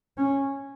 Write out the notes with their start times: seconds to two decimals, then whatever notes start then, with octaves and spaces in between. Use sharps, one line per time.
0.18 C#4